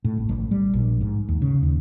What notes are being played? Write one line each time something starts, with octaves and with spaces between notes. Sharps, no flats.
A2
G#1
A1
G3
A#1
G#2
D#2
C#3
D#2